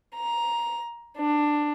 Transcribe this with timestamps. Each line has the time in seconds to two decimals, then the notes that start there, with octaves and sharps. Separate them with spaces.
0.15 A#5
1.17 D4